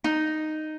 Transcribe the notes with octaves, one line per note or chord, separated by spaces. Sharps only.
D#4